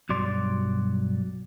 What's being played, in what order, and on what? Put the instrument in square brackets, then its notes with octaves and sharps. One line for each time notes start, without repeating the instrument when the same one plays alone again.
[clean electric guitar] B1 G2 F#3 D5 C6